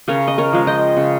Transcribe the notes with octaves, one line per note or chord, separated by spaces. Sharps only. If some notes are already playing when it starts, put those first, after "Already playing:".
C#3 A#4 C#5
D#5
A#4 C#5
F3 G#3
D#5 G5
C#3